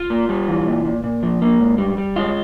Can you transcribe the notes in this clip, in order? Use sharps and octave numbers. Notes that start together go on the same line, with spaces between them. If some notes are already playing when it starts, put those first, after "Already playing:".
Already playing: F4
A#3
G3
E3
A#2
A#2
A#2
F3
A#3
G#2
G3
G3
G#3 F4